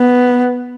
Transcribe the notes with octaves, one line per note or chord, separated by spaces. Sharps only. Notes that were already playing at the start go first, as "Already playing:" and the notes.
Already playing: B3